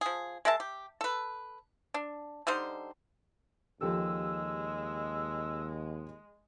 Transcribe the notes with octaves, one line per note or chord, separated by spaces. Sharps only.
F3 G#4
G#3 A#4 E5 A5
G4
A4 B4
D4
D3 G3 D#4 C5
D#2 F3 G#3 G4 A4 E6